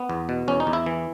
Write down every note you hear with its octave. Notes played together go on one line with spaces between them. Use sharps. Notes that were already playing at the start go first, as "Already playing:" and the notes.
Already playing: B3
E2
B2
E2 C#4
D#4
E2
E4
E3